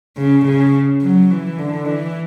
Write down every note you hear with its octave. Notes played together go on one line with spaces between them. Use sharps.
C#3
C#3
F#3
E3
D3
E3